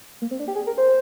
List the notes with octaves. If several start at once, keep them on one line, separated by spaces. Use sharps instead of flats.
A#3
C4
D4
G4
G#4
A#4
C5